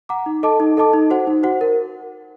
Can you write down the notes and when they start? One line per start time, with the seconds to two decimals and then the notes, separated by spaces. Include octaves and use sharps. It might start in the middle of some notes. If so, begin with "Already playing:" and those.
0.09 F#5 A#5 D6
0.26 D#4
0.43 A4 D#5 A5 D6
0.60 D#4
0.77 A4 D#5 A5 D6
0.93 D#4
1.10 F#4 C5 F#5
1.27 D#4
1.43 F#4 C5 F#5
1.61 A#4